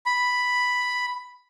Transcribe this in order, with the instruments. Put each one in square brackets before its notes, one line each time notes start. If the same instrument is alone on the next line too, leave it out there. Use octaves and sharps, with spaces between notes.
[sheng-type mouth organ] B5